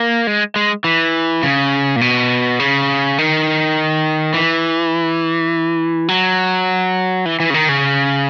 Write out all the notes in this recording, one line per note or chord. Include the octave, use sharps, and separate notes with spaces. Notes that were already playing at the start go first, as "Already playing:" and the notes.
Already playing: A#3
G#3
G#3
E3
C#3
A#2
B2
C#3
D#3
E3
F#3
E3
E3
C#3
D#3
C#3